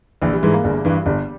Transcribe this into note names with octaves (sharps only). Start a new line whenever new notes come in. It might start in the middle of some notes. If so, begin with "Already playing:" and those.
A#1 E3
G3
G#2 E3 G#3
A#3
G1 G#3
G2 E3
G1 G3